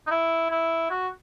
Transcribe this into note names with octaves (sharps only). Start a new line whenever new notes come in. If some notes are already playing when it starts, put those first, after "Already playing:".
D#4
E4
E4
F#4